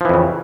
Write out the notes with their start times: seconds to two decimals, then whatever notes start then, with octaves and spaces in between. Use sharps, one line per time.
0.01 F3
0.05 E3
0.09 F2
0.14 C#3